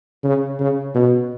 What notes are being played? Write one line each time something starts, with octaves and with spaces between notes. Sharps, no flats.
C#3
C#3
B2